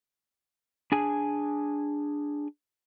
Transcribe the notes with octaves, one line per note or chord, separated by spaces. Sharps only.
D4 G#4 G#5